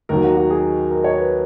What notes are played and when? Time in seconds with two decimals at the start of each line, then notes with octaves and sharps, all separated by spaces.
0.09 D#2 D#3 F#3 A#4
0.23 F#4
0.37 F#4
0.50 G#4
0.91 A#4
1.04 C#5
1.18 B4